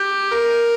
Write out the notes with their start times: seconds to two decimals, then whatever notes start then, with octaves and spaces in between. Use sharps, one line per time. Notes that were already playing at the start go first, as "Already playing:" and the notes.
Already playing: G4
0.32 A#4